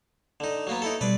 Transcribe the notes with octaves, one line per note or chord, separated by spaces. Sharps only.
D3 D#4
F#3 A#3 B3
D#4 E4 A4
B2 G3 B4 D5